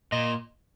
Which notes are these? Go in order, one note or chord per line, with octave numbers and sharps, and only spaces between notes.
A#2 D#5